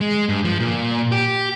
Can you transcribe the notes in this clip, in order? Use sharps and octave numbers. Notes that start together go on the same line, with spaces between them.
G#3
G2
F3
A#2
G4